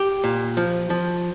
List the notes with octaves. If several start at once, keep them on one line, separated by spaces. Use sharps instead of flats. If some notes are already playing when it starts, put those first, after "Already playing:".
Already playing: G4
A#2
F3
F3